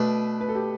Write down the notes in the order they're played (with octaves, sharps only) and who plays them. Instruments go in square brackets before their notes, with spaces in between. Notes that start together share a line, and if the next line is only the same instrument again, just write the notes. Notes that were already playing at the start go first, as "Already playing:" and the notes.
Already playing: [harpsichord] B2 A3 D4 [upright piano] B4
[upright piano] B4
A4
G4